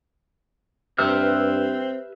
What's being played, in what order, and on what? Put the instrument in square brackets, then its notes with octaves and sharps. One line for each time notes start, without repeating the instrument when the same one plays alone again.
[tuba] G2 [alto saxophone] C4 [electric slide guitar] G4 E5 [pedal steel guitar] B4 E6 F6